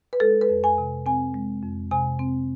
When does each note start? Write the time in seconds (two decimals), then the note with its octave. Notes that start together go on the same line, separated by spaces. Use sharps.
0.13 B4
0.20 G#3 A4
0.41 B4
0.49 F2
0.64 G#5
0.78 C3
1.06 C4 G#5
1.34 G#3
1.62 F2
1.91 C3 G#5
2.19 C4